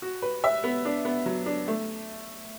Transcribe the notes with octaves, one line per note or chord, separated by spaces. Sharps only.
F#4
B4
E5
B3
D4
B3
F#3
D4
A3